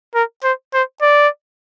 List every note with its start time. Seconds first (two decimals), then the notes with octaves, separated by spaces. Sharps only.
0.15 A#4
0.44 C5
0.74 C5
1.02 D5